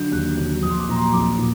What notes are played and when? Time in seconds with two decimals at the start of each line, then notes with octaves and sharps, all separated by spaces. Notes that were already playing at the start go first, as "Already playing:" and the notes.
Already playing: D3 F#3 G6
0.11 D#2 F#6
0.37 D3 F#3
0.62 A#1 D#6
0.71 C6
0.80 D6
0.89 A#2 F#3 A#5
0.96 C6
1.13 A#1 D6
1.38 A#2